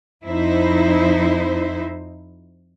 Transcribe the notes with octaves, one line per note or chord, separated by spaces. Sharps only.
F2 D#4 E4 C5